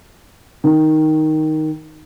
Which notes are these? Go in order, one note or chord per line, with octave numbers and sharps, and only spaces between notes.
D#3